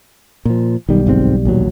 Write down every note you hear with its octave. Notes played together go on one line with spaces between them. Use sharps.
A#2 F3
B1 D#3 G3
G1 G#2 C4
A#1 D#2 F#3